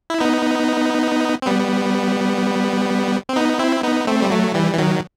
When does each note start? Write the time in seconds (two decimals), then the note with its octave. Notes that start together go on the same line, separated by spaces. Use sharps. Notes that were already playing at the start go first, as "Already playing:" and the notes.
0.10 E4
0.20 B3 D#4
1.42 C4
1.46 G3 B3
3.29 C4
3.36 B3 D#4
3.59 C4 E4
3.83 B3 D#4
4.07 A3 C4
4.22 G3
4.30 F#3 A3
4.54 E3 G3
4.73 E3
4.78 D#3 F#3